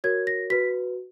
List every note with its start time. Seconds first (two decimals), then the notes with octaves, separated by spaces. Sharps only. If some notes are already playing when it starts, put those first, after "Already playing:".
0.04 F#4 A#4 C#5 G#6
0.27 A#6
0.50 F#4 B4 B6